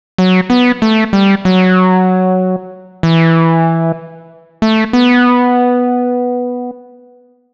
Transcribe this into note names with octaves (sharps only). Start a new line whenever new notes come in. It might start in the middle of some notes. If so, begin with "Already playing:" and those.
F#3
B3
A3
G3
F#3
E3
A3
B3